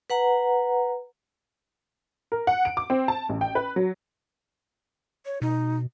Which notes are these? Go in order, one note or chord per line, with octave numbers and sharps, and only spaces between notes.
B4 F#5 A#5
A#4
F#5
D7
D6
C4
A5
A1
G5
B4
F#3
C#5
B2 D#4